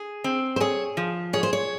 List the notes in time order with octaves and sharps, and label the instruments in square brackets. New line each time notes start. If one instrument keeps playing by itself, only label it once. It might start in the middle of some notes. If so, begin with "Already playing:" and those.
Already playing: [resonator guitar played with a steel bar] G#4
C4
[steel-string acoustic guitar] C5
[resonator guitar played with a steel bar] G#4 [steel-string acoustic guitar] C#5
[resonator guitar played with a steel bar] F3
[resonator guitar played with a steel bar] G#4 [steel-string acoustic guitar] C#5
[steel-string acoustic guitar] C5
C#5